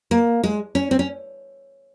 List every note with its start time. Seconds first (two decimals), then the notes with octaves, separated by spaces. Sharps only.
0.11 A#3
0.43 G#3
0.75 C#4
0.91 C4
0.99 C#4